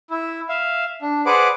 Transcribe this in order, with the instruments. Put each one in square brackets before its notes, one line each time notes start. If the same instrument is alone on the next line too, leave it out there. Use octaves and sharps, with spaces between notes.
[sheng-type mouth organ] E4
E5 F5
D4
G#4 B4 C5 D5 F#5 D6